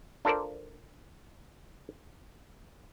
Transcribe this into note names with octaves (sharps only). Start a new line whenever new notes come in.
D4 F4 A4 A#4 C5 D5